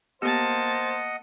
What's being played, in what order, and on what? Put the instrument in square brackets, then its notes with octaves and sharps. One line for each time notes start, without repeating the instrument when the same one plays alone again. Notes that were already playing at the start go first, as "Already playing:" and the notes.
[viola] A#3 A5 [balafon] B3 G4 [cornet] C5 [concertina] D#5 F#5